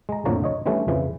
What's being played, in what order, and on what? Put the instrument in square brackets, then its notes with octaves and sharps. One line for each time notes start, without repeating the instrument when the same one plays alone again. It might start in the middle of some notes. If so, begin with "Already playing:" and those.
[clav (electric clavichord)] G#3 A#5
F2 A2 D3 A#3 C#5 A#5
C#5 D#5
D3 E3 G3 A3 C#4
F2 C#3 E3